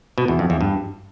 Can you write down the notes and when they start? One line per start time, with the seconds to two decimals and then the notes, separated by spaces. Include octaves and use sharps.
0.18 B2
0.28 E2
0.39 F2
0.50 E2
0.61 G2